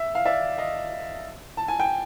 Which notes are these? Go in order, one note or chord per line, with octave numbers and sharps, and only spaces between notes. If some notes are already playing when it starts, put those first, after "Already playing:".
Already playing: E5
F5
D5 E5
D#5 F5
A5
G#5
G5